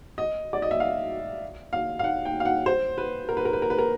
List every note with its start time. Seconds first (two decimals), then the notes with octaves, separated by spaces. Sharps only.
0.18 D#5
0.53 D5
0.62 D#5
0.71 E5
0.80 F5
1.73 F5
1.99 F5
2.04 F#5
2.25 G5
2.40 F5
2.45 F#5
2.66 C5
2.98 B4
3.29 A#4
3.37 B4
3.45 A#4
3.53 B4
3.62 A#4
3.70 B4
3.78 A#4